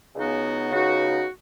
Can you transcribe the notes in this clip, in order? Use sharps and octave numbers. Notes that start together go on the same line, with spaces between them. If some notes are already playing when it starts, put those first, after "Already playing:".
C#2 C#3 B3 D#4 F#4
C#2 C#3 B3 D#4 F#4